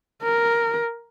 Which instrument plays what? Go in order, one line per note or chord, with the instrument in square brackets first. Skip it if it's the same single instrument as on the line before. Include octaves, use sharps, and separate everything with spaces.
[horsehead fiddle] A#4